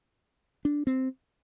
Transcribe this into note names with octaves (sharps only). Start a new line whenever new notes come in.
D4
C4